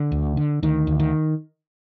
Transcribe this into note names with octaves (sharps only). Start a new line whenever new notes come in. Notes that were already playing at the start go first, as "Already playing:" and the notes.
Already playing: D3
D2
D3
D2 D#3
D2
D#3